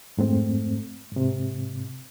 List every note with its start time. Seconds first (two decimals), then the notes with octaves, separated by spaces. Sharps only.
0.17 F2 G#2 A3 C4
1.12 G#2 C3